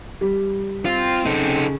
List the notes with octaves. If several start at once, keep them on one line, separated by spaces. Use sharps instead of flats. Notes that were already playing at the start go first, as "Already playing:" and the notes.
G3
C4 F4
C#3 C#4 D#4 A4